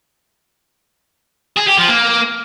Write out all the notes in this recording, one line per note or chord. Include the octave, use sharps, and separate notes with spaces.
G#4
G4
F3
A#3